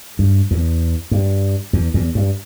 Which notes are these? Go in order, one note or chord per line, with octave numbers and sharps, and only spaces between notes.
G2
E2
G2
E2
E2
G2